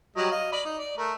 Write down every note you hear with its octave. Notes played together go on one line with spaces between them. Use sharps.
F#3 G3 D#5
D#5 F5
D5 D#5 B5
D#4
D5
A3 A#4